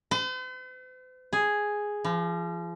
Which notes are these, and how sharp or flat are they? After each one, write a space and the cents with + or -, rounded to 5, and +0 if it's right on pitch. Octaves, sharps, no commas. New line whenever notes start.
C5 -45
G#4 +0
F3 -35